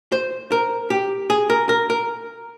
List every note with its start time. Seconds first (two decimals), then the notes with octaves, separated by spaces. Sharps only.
0.12 C5
0.52 A#4
0.90 G4
1.30 G#4
1.50 A#4
1.69 A#4
1.90 A#4